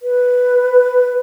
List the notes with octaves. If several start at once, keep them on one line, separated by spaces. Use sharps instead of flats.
B4